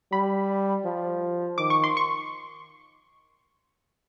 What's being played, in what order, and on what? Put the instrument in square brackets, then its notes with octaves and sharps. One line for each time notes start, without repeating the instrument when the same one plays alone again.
[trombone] G3 [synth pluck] B5
[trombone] F3
[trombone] D#3 [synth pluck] D6
[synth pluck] C#6
C6
C#6